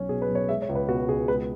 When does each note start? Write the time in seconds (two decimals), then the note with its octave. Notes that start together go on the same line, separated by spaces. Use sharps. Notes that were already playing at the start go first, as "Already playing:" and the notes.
Already playing: B1 F#3 C#4
0.09 B2 G#4
0.22 B4
0.29 B1
0.35 C#5
0.48 G#3 E5
0.62 C#5
0.69 C#2
0.75 B4
0.88 B2 F#4
1.08 C#2 G#4
1.28 G#3 B4